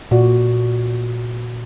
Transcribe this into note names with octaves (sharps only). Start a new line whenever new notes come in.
A#2 F#4 D5